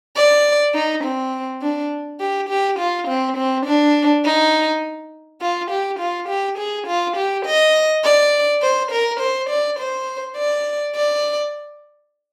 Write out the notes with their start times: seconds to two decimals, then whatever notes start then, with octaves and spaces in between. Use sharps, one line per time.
0.16 D5
0.74 D#4
1.04 C4
1.62 D4
2.20 G4
2.49 G4
2.79 F4
3.08 C4
3.37 C4
3.66 D4
4.25 D#4
5.41 F4
5.70 G4
6.00 F4
6.29 G4
6.58 G#4
6.87 F4
7.17 G4
7.46 D#5
8.04 D5
8.62 C5
8.92 A#4
9.21 C5
9.50 D5
9.79 C5
10.37 D5
10.96 D5